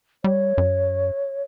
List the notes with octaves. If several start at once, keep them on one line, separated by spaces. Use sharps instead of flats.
G3 C#5
F#2